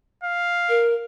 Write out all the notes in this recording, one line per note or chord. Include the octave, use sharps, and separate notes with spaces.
F5
A#4